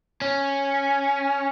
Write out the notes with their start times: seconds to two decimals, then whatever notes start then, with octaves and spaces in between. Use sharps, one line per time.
0.22 C#4